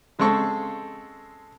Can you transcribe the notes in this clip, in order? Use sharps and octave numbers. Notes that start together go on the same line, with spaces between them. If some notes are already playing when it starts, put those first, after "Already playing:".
C#3 G#3 C4 A4 C#6